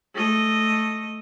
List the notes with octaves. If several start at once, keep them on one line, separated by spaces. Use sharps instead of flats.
A3 D#5